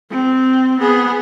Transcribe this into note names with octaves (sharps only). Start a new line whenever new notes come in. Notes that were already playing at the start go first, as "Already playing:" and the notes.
C4
B3 G#4